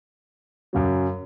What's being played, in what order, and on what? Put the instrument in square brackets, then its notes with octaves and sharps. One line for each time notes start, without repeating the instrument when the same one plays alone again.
[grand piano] F#2 C#3 F#3